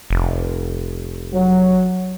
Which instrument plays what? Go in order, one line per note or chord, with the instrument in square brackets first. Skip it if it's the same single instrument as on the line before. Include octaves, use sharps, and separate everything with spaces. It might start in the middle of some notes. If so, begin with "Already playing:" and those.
[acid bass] F1
[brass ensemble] F#3